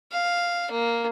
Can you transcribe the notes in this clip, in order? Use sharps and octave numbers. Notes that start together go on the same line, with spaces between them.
F5
A#3